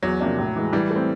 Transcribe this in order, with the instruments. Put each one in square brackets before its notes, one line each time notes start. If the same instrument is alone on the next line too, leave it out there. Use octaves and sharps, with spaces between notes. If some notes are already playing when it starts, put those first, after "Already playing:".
[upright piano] E2 [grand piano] F#3
[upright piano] C3 F3 A#3 D4
A2
E3 G#3
[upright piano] E3 [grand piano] G3
[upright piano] A3 C4